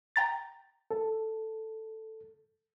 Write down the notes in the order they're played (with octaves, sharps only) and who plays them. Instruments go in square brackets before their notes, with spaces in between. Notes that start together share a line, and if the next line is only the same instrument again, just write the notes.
[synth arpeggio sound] G5 A#5 A6
[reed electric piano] A4